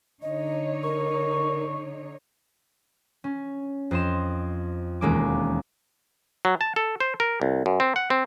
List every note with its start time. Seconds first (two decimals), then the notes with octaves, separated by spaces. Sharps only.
0.22 D3 D#4 C#5 D#5
0.83 A#4 C#6
3.24 C#4
3.91 F2 C5 D#5 C6 E7
5.01 E1 D#2 G#3 A#3 C#4 D6
6.45 F#3
6.61 A5
6.76 A4
7.00 C5
7.20 A#4
7.42 C2
7.66 F#2
7.80 C4
7.96 F#5
8.10 C4